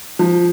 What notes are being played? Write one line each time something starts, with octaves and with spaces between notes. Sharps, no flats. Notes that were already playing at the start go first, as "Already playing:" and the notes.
F3